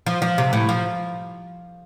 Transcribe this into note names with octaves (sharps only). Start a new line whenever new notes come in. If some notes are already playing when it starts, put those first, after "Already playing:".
F3
F3
C3
A2
F3